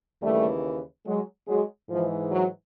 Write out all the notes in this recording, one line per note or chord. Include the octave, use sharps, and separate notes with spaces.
D#2 C#3 E3 G3 A3
F#3 G#3
F#3 G#3
G#2 E3 F3
F#3